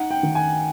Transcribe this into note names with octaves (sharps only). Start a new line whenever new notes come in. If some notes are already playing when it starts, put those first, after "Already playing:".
Already playing: D#4 F#5
G5
D#3
G#5